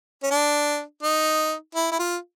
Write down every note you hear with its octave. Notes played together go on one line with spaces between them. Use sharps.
C#4
D4
D#4
E4
E4
F4